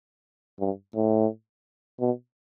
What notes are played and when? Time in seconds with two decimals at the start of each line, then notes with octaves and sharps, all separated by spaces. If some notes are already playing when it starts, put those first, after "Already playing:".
0.60 G2
0.95 A2
2.00 B2